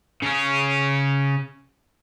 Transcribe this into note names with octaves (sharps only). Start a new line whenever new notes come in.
C#3 C#4